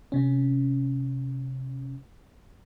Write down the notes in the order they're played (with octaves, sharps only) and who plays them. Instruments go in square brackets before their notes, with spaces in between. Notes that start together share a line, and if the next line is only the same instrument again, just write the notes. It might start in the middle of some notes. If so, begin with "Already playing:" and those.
[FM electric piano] C3 C#4